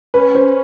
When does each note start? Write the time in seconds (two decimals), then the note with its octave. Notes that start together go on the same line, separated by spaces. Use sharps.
0.14 C#4 B4
0.35 C5